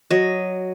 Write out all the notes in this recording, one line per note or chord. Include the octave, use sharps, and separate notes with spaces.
F#3 D#5